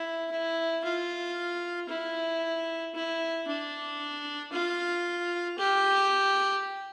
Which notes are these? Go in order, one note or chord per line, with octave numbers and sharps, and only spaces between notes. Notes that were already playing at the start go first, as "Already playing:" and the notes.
Already playing: E4
E4
F4
E4
E4
D4
F4
G4